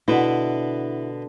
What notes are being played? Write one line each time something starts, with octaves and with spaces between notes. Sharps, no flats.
B2 D3 B3 E4